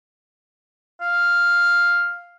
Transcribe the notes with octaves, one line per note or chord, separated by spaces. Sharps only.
F5